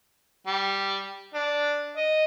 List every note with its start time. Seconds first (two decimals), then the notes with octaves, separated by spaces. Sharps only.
0.47 G3
1.34 D4
1.97 D#5